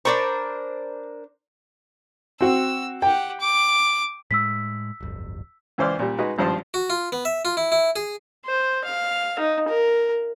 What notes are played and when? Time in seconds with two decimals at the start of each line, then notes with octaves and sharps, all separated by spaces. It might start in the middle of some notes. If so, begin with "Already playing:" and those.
0.05 D4 A#4 C5 D5 B5 C#6
2.41 C4 F#4 E6
3.02 G4 F#5 G5
3.40 D6
4.31 A2 G#3 E6 B6
5.00 D1 G1 F2
5.78 C#2 E3 C5 D5 F6
5.99 A#2 G3
6.19 G#3 D#4 F#4 B4
6.38 G#1 G2 F3 C5 F5 A5
6.74 F#4
6.90 F4
7.12 B3
7.25 E5
7.45 F4
7.57 E4
7.72 E4
7.96 G#4
8.46 C5
8.84 F5
9.39 D#4
9.68 A#4